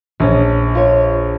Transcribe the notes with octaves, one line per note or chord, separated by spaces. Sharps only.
A#1 C#4 D#4
F4 C#5